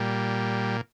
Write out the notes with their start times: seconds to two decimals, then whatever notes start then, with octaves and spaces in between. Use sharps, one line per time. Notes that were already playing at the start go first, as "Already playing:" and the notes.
Already playing: A#2 G3